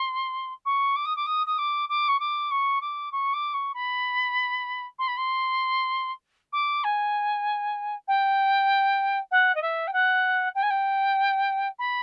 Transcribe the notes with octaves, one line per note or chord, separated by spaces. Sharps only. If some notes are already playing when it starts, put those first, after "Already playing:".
Already playing: C6
C#6
D6
D#6
D6
D#6
D#6
D6
D6
C#6
D6
C#6
D6
C#6
D6
C#6
B5
C6
B5
C6
D6
G#5
G5
F#5
D#5
E5
G5
F#5
G5
G#5
G5
B5